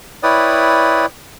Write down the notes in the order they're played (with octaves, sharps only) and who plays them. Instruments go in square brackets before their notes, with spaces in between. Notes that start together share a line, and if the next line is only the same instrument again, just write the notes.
[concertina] E4 B4 C#5 D5 G5 D#6